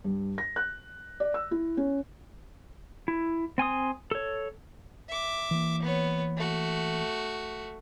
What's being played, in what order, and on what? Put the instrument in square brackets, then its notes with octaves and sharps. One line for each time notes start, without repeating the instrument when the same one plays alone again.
[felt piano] G2
A#6
F#6
D5
E6
E4
C#4
[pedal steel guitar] E4
C4 G#5 C6 D#6
A4 C#5
[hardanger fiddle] E5 D6
[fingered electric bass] E3 A#3
[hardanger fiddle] B3 C#5
A3 F#4